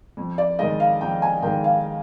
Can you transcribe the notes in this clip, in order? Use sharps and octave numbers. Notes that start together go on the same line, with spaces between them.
F2
D5
D#3 G#3 D#5
F5
F2 G5
G#5
D#3 G#3 G5
F5